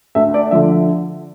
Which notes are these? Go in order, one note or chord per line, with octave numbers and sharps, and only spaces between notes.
D2 E5
D5
D3 F3 E5